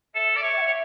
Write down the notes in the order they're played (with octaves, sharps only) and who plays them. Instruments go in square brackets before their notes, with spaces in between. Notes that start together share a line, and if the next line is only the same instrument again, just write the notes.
[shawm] A4 [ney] E5
[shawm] D5
C#5
[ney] G5
E5
[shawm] C#5